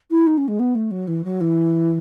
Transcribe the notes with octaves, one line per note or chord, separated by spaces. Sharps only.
E4
D#4
C#4
G#3
B3
A3
F#3
E3
F#3
E3